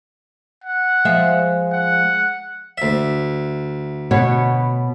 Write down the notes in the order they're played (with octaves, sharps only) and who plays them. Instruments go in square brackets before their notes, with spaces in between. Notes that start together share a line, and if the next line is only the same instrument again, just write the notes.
[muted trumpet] F#5
[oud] F3 G#3 E5
[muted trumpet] F#5
[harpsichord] D2 E5
[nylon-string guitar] B2 B3 C#5